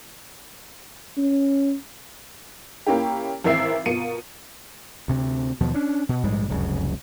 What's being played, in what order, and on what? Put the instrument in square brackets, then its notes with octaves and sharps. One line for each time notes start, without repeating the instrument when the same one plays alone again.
[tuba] C#4
[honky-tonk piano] A#3 C#4 E4 G4
G#1 E3 C4 A#4 E5 C7
B2 F4 A#4 C#7 D#7
[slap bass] D2 C3
D#2 B2 F3 F#3
C#4 D4
B2
A#1 G#2 G3 G#3
F1 C#2 F#2 C#3